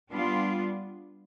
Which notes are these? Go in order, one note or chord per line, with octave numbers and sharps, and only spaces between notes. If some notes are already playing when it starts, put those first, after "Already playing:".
G3 B3 D4 F4